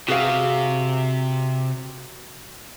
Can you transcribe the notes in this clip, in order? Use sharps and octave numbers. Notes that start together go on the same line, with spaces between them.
C3 F#4 G#4 F5